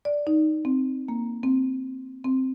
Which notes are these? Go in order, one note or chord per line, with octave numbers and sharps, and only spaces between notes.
D5
D#4
C4
A#3
C4
C4